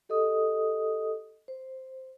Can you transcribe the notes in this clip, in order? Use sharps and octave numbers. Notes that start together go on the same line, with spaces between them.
G4 A4 D#5 D#6
C5